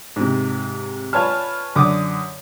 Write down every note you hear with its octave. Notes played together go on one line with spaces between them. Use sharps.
G#2 C3
F4 B4 C#5 G#5 A5 F6
F#2 D3 D6 D#6